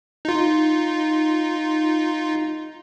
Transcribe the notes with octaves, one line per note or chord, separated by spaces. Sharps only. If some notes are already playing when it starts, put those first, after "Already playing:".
D#4 F4